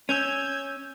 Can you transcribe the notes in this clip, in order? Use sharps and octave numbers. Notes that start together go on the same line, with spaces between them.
C#4 E6 G6 G#6